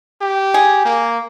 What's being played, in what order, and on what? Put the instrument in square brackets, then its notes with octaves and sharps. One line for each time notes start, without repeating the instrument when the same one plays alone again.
[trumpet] G4
[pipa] G#4
[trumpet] A#3